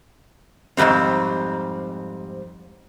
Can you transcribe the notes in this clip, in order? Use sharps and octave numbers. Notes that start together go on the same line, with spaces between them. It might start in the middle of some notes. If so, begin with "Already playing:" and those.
F2 G#2 B2 G3 C4